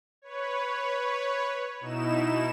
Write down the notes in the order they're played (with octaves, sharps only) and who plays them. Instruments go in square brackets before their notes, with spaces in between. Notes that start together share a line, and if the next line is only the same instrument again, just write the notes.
[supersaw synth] B4 C#5
B2 D#4 E4 E7